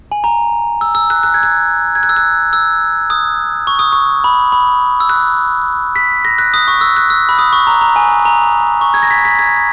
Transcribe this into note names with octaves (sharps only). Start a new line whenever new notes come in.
G#5
A#5
E6
E6
F#6
F#6
G#6
F#6
G#6
F#6
E6
F#6
E6
D#6
C#6
D#6
C#6
B5
B5
E6
F#6
B6
A#6
F#6
D#6
C#6
E6
F#6
E6
B5
D#6
C#6
A#5
A#5
G#5
A#5
C#6
G#6
A#6
B6
B6
G#6